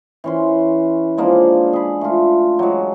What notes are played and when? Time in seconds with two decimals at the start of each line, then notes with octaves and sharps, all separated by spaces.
0.24 E3 C#4 C6
1.17 F3 G#3 A#3 D4
1.73 G#4 B5
2.01 A3 F4
2.59 F#3 G#3